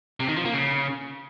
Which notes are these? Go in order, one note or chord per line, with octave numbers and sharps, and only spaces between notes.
C3
D#3
F3
A#3
C#3